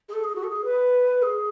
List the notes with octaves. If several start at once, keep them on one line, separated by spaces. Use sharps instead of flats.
G#4
A4
G#4
F#4
A4
G#4
B4
G#4